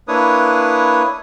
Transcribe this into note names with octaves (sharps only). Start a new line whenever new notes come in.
A#3 D4 E4 B4 C#5 D#6